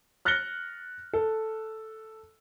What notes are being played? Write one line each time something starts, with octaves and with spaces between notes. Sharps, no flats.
F6 F#6 A6 A#6 C#7 G7
A4